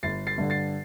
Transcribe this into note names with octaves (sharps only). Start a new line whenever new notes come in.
G1 A6 C7
A6 C7
G2 D3
A6 C7